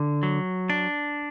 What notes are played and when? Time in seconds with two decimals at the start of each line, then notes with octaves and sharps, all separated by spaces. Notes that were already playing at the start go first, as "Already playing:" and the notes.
Already playing: D3
0.23 F#3
0.70 D4